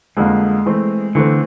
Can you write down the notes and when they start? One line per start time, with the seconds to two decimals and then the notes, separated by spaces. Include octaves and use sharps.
0.17 F2 D3 G3 G#3 A#3
0.66 E3 A3 C4
1.15 D3 E3 A3 C4